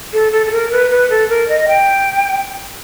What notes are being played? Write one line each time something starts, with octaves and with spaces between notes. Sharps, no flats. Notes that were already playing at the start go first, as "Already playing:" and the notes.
A4
A4
A4
A#4
B4
B4
A4
A#4
D#5
G5